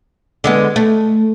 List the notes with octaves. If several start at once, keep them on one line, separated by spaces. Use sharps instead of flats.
D3 G#3 B3
A3